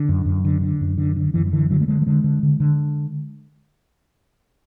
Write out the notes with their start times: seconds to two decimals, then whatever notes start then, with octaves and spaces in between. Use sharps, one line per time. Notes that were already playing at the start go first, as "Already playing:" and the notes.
Already playing: D3
0.09 F#2
0.26 F#2
0.45 D3
0.62 D3
0.81 F#2
0.98 D3
1.16 D3
1.34 F#2 E3
1.46 F#3
1.53 D3 E3
1.70 D3 F#3
1.81 A3
1.88 D3 G#3
2.02 F#3
2.06 D3 G#3
2.24 D3
2.43 D3
2.60 D3